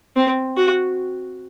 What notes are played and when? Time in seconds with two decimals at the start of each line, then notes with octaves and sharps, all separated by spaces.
0.16 C4
0.57 F#4